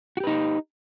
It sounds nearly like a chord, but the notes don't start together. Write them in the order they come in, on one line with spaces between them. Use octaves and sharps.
F#4 G4 B4 D#4